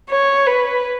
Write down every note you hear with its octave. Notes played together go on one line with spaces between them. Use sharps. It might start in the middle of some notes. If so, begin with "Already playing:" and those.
C#5
B4